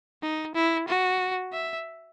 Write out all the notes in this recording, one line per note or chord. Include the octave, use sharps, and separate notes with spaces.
D#4
E4
F#4
E5